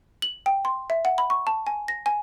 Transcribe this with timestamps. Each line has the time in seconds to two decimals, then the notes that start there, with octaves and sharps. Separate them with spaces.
0.22 F#7
0.46 G5
0.65 C6
0.90 E5
1.05 F#5
1.18 B5
1.30 C#6
1.47 A5
1.67 G#5
1.88 A#6
2.06 G#5